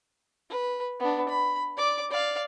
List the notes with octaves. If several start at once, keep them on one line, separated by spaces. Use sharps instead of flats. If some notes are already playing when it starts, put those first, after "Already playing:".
B4
B3 D4
B5
D5 D6
D5 F5